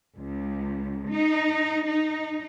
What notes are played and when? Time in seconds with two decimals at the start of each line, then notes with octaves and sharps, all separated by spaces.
0.18 C#2
1.10 D#4
1.87 D#4